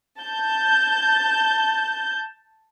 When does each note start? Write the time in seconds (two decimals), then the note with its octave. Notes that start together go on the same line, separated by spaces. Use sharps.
0.19 A5 G6